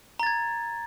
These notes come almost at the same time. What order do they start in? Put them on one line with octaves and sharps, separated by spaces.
A#5 A6 G#6